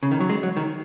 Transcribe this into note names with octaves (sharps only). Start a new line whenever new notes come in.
C#3
D#3
F#3
G#3
F#3
D#3